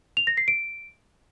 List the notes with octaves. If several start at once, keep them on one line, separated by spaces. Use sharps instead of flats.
F7
A#6
C7
D7